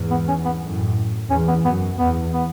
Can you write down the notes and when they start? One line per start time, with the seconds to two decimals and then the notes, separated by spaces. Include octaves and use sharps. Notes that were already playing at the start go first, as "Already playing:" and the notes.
Already playing: E2 G#2
0.11 B3
0.28 C#4
0.45 B3
0.62 F#2 A2
1.30 E2 G#2 C#4
1.48 B3
1.65 F#2 B3
1.99 E2 B3
2.33 B3